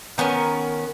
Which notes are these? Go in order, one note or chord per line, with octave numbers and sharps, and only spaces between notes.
D#3 B3 C#4 A#4